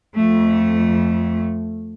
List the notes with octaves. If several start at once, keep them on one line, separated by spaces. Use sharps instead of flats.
F2 A3